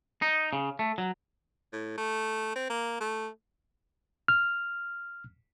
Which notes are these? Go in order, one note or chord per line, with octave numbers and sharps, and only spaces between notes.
D#4
C#3
A3
F#3
A2
A3
C4
A#3
A3
F6